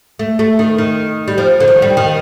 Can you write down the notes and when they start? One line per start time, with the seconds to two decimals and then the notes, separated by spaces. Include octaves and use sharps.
0.19 A3
0.39 A3
0.59 D#3
0.78 D#3
1.28 G3
1.38 F3
1.60 D3
1.68 D#3
1.82 G3
1.97 D#3